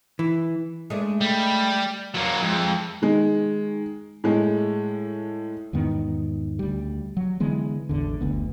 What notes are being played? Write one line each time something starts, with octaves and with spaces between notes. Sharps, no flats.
E3
G#3 A3 D4
G3
E2 F#3 A#3
F2 G#3
D#3 G#3
A2 G#3
E2 G#2 D#3 B3
D2 G3
F#3
D3 E3 G#3 B3
A1 E2 D3
F#1 D2 B3